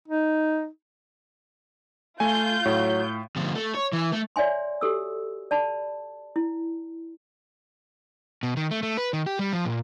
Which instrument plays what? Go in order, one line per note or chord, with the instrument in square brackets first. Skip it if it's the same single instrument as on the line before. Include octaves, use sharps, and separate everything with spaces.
[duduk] D#4
[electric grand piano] A3 G#5 [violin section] F4 G6
[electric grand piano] A2 [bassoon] F#3
[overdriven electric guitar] D2 F3
A3
C#5
E3
A3
[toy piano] C#5 D5 E5 G#5 C6
F#4 G4 A4 E6
D5 A5 B5
E4
[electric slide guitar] B2
D#3
A3
A3
B4
D#3
G4
G3
F3
A#2